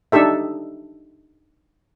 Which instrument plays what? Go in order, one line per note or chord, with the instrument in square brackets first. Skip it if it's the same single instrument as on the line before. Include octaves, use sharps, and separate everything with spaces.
[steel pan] D4 D#4 G4 A4 E5